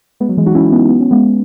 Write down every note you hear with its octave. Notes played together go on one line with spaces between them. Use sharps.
G#3 B3
F#3
E3 G#3
D#4 F#4
C#4 E4
B3 D#4
B3
C#4
G#3 B3